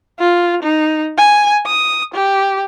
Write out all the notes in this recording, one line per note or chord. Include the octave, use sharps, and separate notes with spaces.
F4
D#4
G#5
D#6
G4